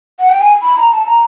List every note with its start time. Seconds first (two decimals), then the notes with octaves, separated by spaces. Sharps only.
0.19 F#5
0.30 G5
0.41 G#5
0.62 B5
0.77 A#5
0.92 A5
1.06 A#5